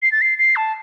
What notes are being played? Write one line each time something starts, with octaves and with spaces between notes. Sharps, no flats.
C7
A6
C7
C7
A5